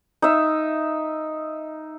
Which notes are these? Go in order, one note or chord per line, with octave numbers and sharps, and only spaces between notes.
D#4 E5